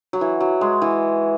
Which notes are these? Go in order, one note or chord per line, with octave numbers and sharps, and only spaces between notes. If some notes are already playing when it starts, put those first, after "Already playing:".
F#3
E3
F#3
G#3
E3